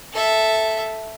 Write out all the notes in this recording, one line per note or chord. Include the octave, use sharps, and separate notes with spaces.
A4 E5